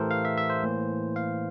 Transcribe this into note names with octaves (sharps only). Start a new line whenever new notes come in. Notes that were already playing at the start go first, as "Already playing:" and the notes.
Already playing: A2 E3 A3 G4 A4 A#4 C5
F5
E5
E5
C5
A2 E3 A#3
F5